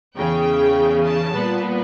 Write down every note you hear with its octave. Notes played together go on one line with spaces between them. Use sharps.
E2 C#3 E3 G5
A5
A#2 G3 B3